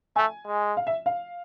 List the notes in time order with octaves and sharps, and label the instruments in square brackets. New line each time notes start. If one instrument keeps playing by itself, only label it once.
[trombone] A3 [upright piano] G#5
[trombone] G#3
[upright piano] F5
E5
F5